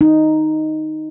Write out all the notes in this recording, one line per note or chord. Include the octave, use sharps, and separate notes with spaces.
D#4